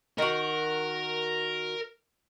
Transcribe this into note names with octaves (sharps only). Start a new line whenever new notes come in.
D#3 F#4 A#4